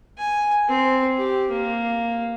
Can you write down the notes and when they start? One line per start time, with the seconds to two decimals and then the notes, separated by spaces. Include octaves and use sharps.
0.18 G#5
0.68 C4
1.17 G4
1.51 A#3